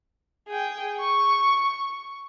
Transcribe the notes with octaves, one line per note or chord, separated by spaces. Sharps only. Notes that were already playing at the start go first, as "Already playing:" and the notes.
G#4 G5
C#6